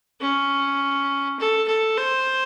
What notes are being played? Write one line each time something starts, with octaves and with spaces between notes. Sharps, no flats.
C#4
A4
A4
C5